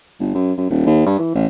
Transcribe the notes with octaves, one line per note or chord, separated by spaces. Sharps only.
G1
F#2
F#2
D#1
D#2
G2
E3
A1